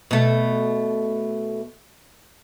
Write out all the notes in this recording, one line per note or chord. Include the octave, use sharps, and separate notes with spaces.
B2 A3